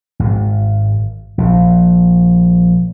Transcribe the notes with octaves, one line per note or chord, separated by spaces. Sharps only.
G#1
A#1